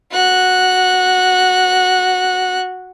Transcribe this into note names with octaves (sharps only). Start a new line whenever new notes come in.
F#4 F#6